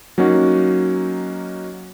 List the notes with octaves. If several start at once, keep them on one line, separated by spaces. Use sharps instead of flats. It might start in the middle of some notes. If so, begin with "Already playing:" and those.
F#3 A#3 C#4 D#4 F#4